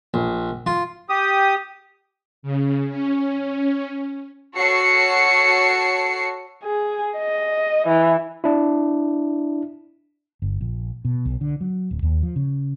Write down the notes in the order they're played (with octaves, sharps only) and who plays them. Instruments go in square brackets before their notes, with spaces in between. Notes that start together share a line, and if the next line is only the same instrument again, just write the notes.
[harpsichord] A#1
F4
[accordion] G4 D#6
[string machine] C#3
C#4
[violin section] F#4 A4 C#5 C7 C#7
[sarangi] G#4
D#5
E3
[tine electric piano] D4 E4
[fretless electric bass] G1
A#1
B2
B1
D3
F#3
D1
D#2
F3
C#3